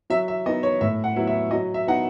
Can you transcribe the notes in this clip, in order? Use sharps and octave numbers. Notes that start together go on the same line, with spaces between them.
F#3 E5
E5
B3 D#4 D#5
C#5
A2 E5
F#5
F#3 B3 E4
E5
F#3 D#5
E5
B3 D#4 F#5